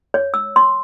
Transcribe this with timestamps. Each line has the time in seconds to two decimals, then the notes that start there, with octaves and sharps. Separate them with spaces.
0.14 C#5
0.34 E6
0.56 C6